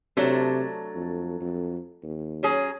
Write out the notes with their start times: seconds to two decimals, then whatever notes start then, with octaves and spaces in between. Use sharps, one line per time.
0.17 C3 F#3 A3 D4
0.95 F2
1.40 F2
2.03 D#2
2.43 F#3 C#4 G#4